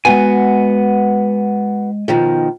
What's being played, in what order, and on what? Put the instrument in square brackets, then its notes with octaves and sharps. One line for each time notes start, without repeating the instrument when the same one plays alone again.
[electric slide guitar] G#3 G#5 [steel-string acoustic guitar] B3 F#4
[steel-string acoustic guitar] B2 D#3 F3